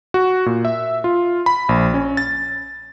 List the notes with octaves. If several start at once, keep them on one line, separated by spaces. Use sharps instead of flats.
F#4
A#2
E5
F4
B5
A#1
C#4
A6